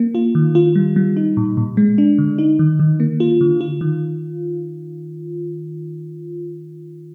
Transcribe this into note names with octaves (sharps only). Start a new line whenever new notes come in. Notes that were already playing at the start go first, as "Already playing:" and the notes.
Already playing: A#3
F4
D#3
F4
G3
G3
D#4
A#2
A#2
G#3
D4
D3
D#4
D#3
D#3
A#3
F4
D3
F4
D#3